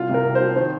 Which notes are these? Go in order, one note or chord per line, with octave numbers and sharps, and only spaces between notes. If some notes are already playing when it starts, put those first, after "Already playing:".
Already playing: C2 F4
C3 A#4
C2
C5
F3
D#3 C5